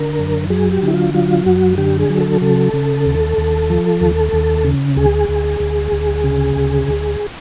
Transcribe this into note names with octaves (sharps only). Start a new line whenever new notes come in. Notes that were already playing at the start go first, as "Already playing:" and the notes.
Already playing: D3 A#4
F#2
F#3 G#4
G4
D3 E4
F4
F#3 F4
F#2 F#4
D3 G4
G#4
F#3
A4
C#3 A4
C#3
D#2
D#2
F3
D#2
D#2
C#3
D2 G#4
D2
D2
D2
C#3
D2
D2